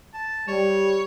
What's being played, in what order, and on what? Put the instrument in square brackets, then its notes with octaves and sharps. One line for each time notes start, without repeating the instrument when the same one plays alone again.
[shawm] A5
[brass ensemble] G3 [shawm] C#5